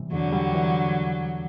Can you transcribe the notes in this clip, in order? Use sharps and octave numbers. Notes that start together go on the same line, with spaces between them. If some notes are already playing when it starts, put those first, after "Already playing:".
Already playing: C3 E3 G3
E2 D3 F#3
G3
E3